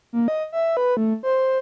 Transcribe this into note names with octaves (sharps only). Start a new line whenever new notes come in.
A#3
D#5
E5
B4
A3
C5